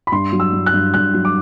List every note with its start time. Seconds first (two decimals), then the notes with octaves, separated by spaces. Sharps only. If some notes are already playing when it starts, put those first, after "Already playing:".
0.07 B5
0.12 G2 C6
0.33 F#3
0.40 E6
0.53 G2
0.66 F#6
0.74 G2
0.94 G2 F#6
1.14 F#3
1.25 D6